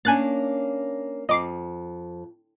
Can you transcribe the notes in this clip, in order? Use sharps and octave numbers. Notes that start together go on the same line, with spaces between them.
A#3 C#4 D4 G#5 F#6 A6
F2 D#5 D6 C7